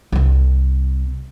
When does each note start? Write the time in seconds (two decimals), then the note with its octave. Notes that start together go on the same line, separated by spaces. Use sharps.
0.12 C2 C4